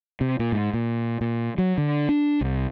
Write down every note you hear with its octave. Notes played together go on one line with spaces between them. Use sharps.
C3
A#2
G#2
A#2
A#2
F#3
D3
D4
C2